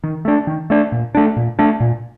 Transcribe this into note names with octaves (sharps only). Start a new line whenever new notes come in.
D#3
A3 D4
D#3
A3 D4
A#2
A3 D4
A#2
A3 D4
A#2